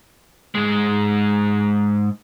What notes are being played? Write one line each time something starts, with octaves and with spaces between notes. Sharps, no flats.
G#2 G#3